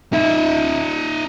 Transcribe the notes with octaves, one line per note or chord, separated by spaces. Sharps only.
D#4 E5